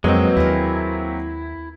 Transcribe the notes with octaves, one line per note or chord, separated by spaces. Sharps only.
F2 B2 F#3 G#3 A#3 C4
D#2 E4 G#4 A#4